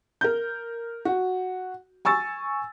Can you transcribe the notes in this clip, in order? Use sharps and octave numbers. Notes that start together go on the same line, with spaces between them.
A#4 G6
F#4
G#5 C#6 E6 A6